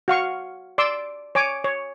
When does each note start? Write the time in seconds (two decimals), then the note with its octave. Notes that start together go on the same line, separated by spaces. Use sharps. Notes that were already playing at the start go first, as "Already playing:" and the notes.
0.08 F#4 F5 C#6
0.78 D5 C6 D6 E6
1.35 C#5 G#5 D6
1.64 C#5